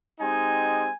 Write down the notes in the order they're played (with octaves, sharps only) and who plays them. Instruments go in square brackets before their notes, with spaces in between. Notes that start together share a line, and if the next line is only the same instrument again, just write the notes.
[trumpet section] G#3 C4 D#4 G4 G#5